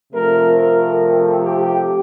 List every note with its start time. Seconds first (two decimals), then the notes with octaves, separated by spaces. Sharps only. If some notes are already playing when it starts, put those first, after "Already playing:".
0.12 C3 F3 A3 C4 A#4
0.55 A#4
1.43 G4